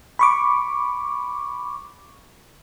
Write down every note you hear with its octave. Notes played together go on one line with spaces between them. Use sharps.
B5 C#6 D6